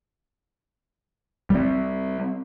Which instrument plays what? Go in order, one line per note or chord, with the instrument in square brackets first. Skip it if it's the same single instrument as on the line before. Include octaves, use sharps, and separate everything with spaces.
[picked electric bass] G3 C4